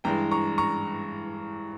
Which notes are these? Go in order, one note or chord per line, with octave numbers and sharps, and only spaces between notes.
G2 E3 G#3 G5 A#5
A#5 C#6
A#5 C#6